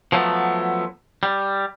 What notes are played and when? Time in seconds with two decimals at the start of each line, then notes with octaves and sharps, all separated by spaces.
0.12 F3 F#3 A3 B3
1.23 G3